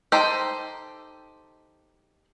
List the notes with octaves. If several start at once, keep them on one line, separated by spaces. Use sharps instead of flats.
D#4 G4 A4 C5 D#5